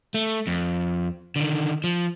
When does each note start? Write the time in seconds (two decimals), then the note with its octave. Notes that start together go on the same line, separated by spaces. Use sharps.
0.14 A3
0.47 F2
1.36 D3 D#3
1.84 F3